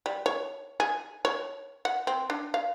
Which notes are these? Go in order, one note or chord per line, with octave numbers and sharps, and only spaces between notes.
G3
C#5
G#4
C#5
F#5
C4
D4
F5